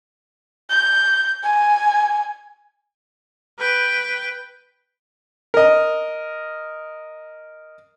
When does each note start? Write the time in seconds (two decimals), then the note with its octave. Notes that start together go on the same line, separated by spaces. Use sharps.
0.70 G6
1.43 G#5
3.58 B4 G5
5.54 A#4 D#5